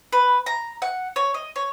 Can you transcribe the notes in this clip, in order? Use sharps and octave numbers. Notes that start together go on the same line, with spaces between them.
B4
A#5
F#5
C#5
D#5
C#5